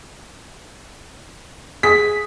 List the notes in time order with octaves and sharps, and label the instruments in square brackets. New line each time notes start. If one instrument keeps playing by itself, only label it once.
[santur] G#4 [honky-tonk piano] B6